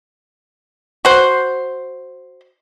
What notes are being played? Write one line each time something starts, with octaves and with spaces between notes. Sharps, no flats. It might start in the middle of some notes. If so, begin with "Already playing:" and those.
F#4 C5